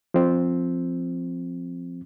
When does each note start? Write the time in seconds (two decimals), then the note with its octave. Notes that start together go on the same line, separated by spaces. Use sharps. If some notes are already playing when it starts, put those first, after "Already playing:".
0.14 F3 C4